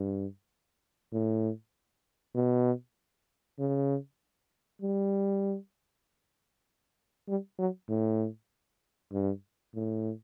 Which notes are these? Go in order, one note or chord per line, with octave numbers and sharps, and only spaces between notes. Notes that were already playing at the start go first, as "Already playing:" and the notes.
Already playing: G2
A2
B2
C#3
G3
G3
F#3
A2
G2
A2